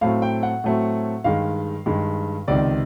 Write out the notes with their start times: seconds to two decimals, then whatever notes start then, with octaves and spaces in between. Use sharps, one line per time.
0.01 A2 F#3 A3 C4 F5
0.22 G5
0.43 F#5
0.64 A2 F#3 A3 C4
1.24 G2 D#3 G#3 F5
1.86 G2 D#3 G#3
2.48 C#2 C3 D#3 D5